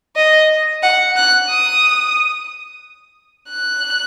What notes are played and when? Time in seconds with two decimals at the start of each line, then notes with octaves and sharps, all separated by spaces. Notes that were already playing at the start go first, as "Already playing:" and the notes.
0.16 D#5
0.83 F#5
1.16 F#6
1.50 D#6
3.51 F#6